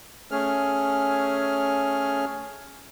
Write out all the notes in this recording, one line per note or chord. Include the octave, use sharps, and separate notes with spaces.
A3 C#4 G#4 F6